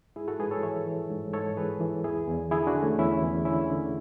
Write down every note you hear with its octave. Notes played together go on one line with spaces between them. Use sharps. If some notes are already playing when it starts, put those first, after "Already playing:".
G#2 E4 G#4
F#4 A4
G#2 G#4 B4
A4 C#5
E3 C#5 E5
E3
G#2
G#2 A4 C#5
E3 G#4 B4
E3
E2 E4 G#4
E2
D3 E4 G#4
D4 F#4
D3
A3 C#4
E2 C#4 E4
E2
D3 C#4 E4
D3